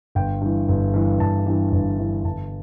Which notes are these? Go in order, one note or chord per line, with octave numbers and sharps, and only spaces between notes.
G1 G5
G2 E3
G1
G2 E3
G1 A5
G2 E3
G1
G2 E3
G1 A5